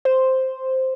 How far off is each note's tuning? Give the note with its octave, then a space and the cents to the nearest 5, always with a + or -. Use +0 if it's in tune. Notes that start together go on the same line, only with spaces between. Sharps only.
C5 +0